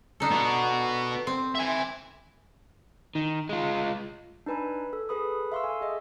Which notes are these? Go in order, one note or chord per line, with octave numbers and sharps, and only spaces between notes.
D4 D#4 A4
B3 F#4
C4
E5 G#5
D#3
G#3 F4
D4 D#4 B4 G#5 B5
A4
G#4 A4 B4 B5 D#6
E5 F5 C6 C#6 E6
A4 G#5
G#4 D#5 E5